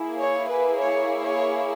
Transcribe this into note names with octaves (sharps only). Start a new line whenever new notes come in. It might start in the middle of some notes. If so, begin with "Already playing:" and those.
Already playing: A#3 E4 G#4
C#5
B4
C#5
C#5